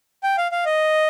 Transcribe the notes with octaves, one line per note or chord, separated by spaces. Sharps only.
G5
F5
F5
D#5